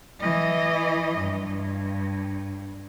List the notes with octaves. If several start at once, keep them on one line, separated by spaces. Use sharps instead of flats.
E3 D#5
G2